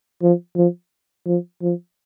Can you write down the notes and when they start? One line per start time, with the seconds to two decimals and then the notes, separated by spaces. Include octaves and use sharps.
0.22 F3
0.56 F3
1.26 F3
1.62 F3